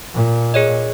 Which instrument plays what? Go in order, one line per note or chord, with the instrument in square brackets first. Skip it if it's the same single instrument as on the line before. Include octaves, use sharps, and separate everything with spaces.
[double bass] A#2
[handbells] G#4 C#5 D#5